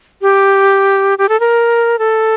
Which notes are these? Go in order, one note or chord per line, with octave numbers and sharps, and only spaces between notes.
G4
G4
A4
A#4
A4